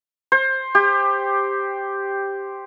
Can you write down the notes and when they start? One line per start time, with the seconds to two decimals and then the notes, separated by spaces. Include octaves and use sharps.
0.32 C5
0.75 G4